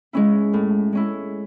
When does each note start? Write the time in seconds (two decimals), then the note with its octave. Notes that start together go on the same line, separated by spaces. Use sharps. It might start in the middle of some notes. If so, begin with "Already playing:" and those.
0.13 G#3 C#4 E4
0.53 A2
0.93 G#3 C#4 E4